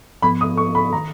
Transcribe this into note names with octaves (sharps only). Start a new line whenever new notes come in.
G#2 F3 B3 B5
D#6
C#6
B5
D#3 A#5